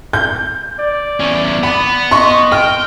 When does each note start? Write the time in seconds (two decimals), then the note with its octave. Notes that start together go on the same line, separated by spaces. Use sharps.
0.13 G6
0.80 D5
1.20 E2 C#4
1.63 B3 B5
2.11 D#5 C6 C#6
2.52 G5 F6